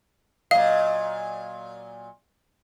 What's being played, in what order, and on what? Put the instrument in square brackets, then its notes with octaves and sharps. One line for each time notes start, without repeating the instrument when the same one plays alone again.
[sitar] A#2 F#3 D#5 [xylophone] F5